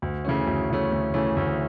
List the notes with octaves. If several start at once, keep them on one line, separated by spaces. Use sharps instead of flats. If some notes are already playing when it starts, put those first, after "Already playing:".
D2
C#3 E3 A3 C#4
D2
C#3 E3 A3 C#4
D2
C#3 E3 A3 C#4
D2